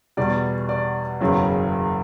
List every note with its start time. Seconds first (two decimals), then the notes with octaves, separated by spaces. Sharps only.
0.17 E2 B2 G3 D5
0.69 D5
1.20 F#1 E2 C#3 F#3